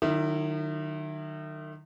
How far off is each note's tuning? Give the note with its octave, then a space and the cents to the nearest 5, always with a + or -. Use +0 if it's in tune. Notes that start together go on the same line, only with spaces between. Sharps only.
D#3 -35 F#3 +0 E4 +0